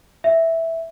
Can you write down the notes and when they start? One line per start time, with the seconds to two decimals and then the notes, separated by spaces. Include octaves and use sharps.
0.24 E5